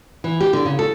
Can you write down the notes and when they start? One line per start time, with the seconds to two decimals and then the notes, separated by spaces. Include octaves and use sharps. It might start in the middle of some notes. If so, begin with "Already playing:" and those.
0.24 E3
0.41 G4
0.53 D3
0.65 C#3
0.79 A4